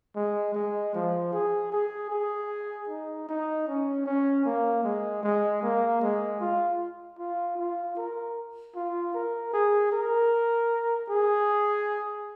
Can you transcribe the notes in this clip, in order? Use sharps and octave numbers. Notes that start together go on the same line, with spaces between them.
G#3
G#3
F3
G#4
G#4
G#4
D#4
D#4
C#4
C#4
A#3
G#3
G#3
A#3
G#3
F4
F4
F4
A#4
F4
A#4
G#4
A#4
G#4